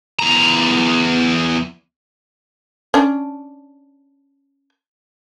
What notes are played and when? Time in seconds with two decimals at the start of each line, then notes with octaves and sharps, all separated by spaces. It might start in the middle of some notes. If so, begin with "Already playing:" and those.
0.19 E2 A#5
2.94 C#4 D4